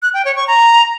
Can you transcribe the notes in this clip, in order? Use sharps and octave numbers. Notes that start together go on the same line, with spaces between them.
F#6
G5
C#5
C#6
A#5